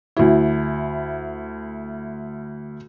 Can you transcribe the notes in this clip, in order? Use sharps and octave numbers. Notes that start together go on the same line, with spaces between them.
D2 E4